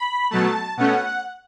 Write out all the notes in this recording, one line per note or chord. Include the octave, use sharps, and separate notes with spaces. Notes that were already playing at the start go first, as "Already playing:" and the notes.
Already playing: B5
B2 F#3 A3 A5
B2 A3 C#4 F#5